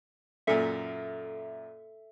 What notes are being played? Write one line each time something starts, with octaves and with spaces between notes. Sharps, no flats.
F#2 A#2 A4 E5